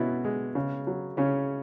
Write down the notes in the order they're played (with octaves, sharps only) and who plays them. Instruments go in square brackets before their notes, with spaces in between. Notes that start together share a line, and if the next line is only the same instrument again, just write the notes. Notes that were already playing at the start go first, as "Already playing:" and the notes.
Already playing: [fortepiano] B2 B3 C#4 E4 F#4
G#3
C#3
F#3
C#3 C#4